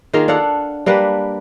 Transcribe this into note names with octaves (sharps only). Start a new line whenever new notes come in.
D#3 A#3 F4 G#4
D4 A4 F5 F#5
G3 A#3 D4 B4